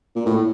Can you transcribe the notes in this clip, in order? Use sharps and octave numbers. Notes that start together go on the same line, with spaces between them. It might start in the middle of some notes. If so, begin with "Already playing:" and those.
A#2
A2